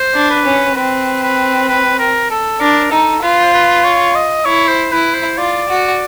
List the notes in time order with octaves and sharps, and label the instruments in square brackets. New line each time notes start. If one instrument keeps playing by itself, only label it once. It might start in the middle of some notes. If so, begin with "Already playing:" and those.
Already playing: [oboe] C5
[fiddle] D4
[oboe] B4
[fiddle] C#4
[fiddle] C4 [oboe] B4
[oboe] B4
B4
A#4
A4
[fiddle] D4 [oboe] A#4
[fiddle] D#4 [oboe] A4
[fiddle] F4 [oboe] B4
[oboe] C5
B4
C#5
D#5
[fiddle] E4 [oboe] C#5
[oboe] C5
[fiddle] E4 [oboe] B4
[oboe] C5
[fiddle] F4 [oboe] D5
[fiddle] F#4